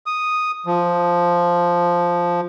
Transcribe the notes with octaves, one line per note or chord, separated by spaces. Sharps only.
D#6
F3